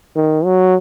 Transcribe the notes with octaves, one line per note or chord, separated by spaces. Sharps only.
D#3
F#3